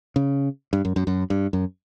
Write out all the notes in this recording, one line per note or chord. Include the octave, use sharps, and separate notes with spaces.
C#3
G2
F#2
F#2
F#2
G2
F#2